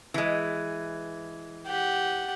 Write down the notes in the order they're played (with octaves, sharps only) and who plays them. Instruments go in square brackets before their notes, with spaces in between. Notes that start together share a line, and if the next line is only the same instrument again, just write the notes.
[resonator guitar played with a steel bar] E3 G#3
[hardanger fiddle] G4 F#5